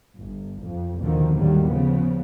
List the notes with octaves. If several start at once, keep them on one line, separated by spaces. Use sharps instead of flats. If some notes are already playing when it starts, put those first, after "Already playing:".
G1
F2
D#2 B2 D3 D#3 F3
D#2 A2 D#3 F#3 G3
C#3 F3 B3